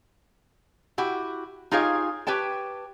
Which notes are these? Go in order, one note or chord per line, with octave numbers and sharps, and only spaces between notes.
E4 F#4 G4
D#4 F4 G4 G#4 C#5 F5
G4 B4 C#5 G5 A5